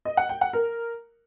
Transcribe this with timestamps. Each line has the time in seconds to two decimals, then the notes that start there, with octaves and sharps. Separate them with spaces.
0.05 D#5
0.17 F#5
0.29 G5
0.41 F#5
0.53 A#4